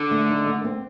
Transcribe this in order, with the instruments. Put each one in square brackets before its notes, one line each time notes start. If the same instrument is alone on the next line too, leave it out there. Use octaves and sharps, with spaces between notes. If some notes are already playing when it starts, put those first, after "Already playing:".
Already playing: [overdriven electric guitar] D3
[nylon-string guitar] A3
D#4
A3
C4